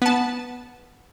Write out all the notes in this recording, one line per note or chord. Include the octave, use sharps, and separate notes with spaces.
B3 A5